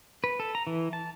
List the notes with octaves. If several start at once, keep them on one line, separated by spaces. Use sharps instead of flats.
B4
A4
A#5
E3
A5